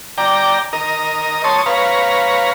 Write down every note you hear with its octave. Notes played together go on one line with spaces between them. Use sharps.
D5 G5 A#5
A#4 D#5
C#5 A5 C6 D#6
B4 C#5 F5 A#5